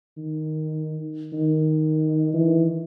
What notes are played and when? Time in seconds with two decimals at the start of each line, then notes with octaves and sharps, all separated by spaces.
0.17 D#3
1.33 D#3
2.34 E3